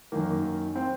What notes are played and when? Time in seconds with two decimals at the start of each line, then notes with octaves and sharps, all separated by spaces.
0.12 F#2 D#3 A#3
0.76 C4